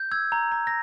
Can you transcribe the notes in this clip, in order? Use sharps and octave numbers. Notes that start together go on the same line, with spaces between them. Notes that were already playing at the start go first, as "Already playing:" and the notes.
Already playing: G6
E6 G#6
A#5
A#5
A#6